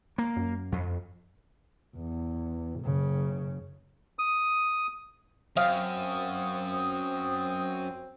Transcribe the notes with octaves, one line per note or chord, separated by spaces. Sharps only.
A#3
F#2
F2
E2
F#1 C#3
D#6
F#2 C4 F5 D#6